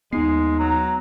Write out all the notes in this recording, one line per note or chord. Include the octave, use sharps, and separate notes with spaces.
D#2 G#3 B3 D#4 C7
F#3 A#5